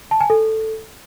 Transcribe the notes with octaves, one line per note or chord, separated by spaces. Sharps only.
A5
G#5
A4